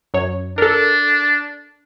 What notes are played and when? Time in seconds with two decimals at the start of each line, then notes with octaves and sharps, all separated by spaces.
0.14 F#2 C#5
0.58 D4 A4 A#4